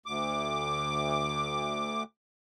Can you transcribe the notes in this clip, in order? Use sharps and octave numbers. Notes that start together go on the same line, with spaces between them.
D2 D6